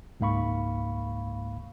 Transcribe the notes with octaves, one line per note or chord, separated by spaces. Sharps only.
C#2 G#2 A#3 F5 B5 C#6